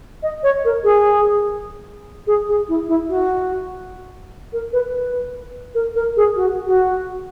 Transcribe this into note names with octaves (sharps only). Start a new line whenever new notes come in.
D#5
C#5
A#4
G#4
G#4
G#4
E4
E4
F#4
A#4
B4
B4
A#4
A#4
G#4
F#4
F#4